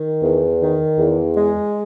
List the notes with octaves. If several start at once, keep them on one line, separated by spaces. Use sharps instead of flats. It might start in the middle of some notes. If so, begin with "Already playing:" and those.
Already playing: D#3
E2
D#3
E2
G#3